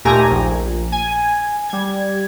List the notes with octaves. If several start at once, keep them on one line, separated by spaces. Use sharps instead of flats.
D#2 A#2 A3 G4 G#5 A#5
A#1
G#5
G3 G#6